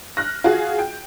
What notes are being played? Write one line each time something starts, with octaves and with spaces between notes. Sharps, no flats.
F6 F#6 A#6
F4 F#4 G#4
G5